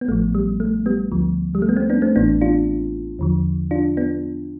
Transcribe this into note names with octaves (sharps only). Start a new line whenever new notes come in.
B3
A1 A2 F3 A3
G3
A3
G3 B3
D2 D3 F3
G3
A3
B3
A3 C4
B3 D4
A3 C4
A1 A2 E3 B3 D4
D4 F4
E2 D3 F3
D4 F4
B3 D4